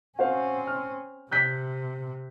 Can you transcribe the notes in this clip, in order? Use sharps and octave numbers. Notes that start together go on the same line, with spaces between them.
C4 C#4 F#4 C5 F5
F6
C3 F#6 G6 B6